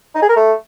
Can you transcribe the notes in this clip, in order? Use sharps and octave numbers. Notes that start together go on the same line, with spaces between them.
D#4
G#4
A#4
A3